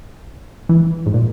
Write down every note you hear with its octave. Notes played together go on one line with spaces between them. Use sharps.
E3
G#2
A#2